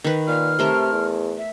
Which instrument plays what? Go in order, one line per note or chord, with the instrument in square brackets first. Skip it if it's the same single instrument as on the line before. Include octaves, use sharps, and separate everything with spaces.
[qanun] D#3 B4
[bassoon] A#2 [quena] F6
[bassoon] C3 [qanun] A3 A#4 C6
[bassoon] E2
[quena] E5